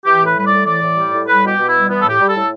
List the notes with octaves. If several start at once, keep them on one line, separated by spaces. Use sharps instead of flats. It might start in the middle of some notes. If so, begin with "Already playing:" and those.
E3 G4
A2 B4
G3 B4
D5
A2
E3 D5
A2
G3
A2
G3 B4
B2 G4
B2
E4
G3
E3 B3
A2 A4
G4
G3
A4
A2